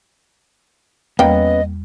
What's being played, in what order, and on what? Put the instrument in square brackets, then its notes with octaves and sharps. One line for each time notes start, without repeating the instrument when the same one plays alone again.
[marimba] E2 G3 [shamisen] A#3 G5 [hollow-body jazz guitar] B3 C#4 [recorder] D#5